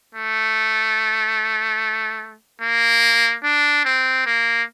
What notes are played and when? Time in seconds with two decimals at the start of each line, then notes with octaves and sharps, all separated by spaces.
0.15 A3
2.61 A#3
3.44 D4
3.85 C4
4.26 A#3